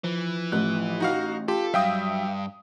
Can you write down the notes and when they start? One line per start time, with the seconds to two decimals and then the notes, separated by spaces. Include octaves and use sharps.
0.04 E3 F3
0.52 A1 F#6
1.00 D#4 F#4 F5
1.48 F4 G4 A4
1.74 G2 F#3 E5 F5 G5 D#6